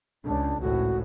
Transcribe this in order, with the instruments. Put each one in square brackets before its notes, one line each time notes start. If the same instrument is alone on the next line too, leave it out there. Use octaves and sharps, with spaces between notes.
[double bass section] C#2 [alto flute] D4
[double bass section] G#1 C#2 A2 [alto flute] F#4